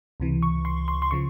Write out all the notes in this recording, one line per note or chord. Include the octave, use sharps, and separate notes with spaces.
C#2 C3 E3
C#6
C6
C6
C6
C#3 F3 C#6